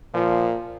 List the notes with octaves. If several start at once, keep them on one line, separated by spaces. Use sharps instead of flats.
A#2 F3